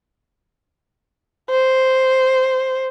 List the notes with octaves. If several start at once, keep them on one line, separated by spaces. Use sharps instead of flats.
C5